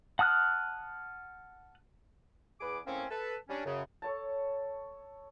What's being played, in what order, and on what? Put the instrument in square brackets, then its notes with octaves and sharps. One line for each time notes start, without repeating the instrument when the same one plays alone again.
[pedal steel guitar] F#5 A5 D#6 F6 F#6
[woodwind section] E2 G#4 B4 D6
A2 A#3 C4 C#4
A4 B4
G3 C#4 D4
F#2 C#3
[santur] A4 C#5 A5